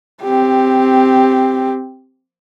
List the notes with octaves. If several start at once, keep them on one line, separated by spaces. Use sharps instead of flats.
C4 G4